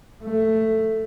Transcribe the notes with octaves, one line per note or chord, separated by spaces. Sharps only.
A3